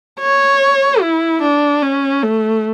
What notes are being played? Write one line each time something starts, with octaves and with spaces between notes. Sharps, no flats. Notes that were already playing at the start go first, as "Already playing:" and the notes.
C#5
E4
D4
C#4
A3